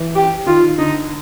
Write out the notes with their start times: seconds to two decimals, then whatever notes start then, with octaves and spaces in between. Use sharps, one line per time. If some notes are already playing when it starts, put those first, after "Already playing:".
Already playing: E3
0.15 G4
0.46 D#3 F4
0.78 D3 D#4